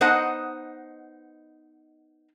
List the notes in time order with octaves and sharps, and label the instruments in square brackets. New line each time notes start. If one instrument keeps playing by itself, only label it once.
[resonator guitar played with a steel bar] B3 D#4 C5 D#5 F#5 A5